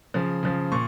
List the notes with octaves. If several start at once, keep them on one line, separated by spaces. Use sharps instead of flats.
C#3 F3
C#3 F3
A#2 C#6